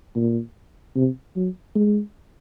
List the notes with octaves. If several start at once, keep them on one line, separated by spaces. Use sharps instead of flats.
A#2
C3
F#3
G#3